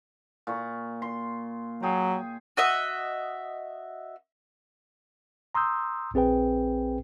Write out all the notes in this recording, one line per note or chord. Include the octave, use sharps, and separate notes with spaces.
A#2 C#6
C6
F#3 G#4 G5
F#4 D#5 E5
A#5 C6 D#6 E6 G6
A#1 C4 G#4 B4 G5